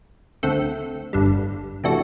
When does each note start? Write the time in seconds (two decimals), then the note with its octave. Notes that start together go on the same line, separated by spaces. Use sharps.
0.43 D2 D3 A3 C4
1.13 G1 G2 D3 G3
1.84 C3 E3 A3 D4 F#4